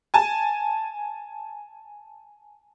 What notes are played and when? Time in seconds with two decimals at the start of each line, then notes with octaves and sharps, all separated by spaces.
0.14 G#5 A5